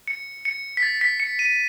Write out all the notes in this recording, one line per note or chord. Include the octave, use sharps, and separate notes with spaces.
C#7
C#7
B6
A6
B6
C#7
D#7